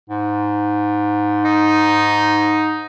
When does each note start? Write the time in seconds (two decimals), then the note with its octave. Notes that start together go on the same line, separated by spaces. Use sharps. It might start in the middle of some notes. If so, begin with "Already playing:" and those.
0.10 G#2
1.44 D#4